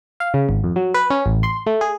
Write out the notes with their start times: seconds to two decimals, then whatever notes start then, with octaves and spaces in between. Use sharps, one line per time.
0.20 F5
0.34 C#3
0.49 G#1
0.64 F2
0.76 F#3
0.94 B4
1.10 C#4
1.26 A1
1.43 C6
1.67 A3
1.81 G#4